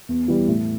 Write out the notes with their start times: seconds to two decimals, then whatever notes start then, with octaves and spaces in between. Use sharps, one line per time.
0.09 E2
0.28 E3 G3
0.48 A2